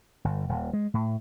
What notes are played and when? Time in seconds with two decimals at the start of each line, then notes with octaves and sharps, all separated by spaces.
0.24 G1
0.49 D#1
0.73 G#3
0.94 A2